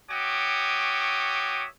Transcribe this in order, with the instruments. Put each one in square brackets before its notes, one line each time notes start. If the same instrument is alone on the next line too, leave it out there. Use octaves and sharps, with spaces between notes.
[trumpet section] F#4 C#5 E5 G5 D6 D#6